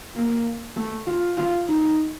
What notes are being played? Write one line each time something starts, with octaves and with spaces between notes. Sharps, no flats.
A#3
A3
F4
F4
D#4